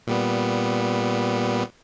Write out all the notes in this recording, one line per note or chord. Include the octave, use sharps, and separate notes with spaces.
A#2 G3 B3